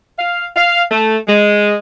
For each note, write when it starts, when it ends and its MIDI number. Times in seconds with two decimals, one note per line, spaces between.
0.19 0.46 77
0.56 0.83 77
0.91 1.16 57
1.27 1.75 56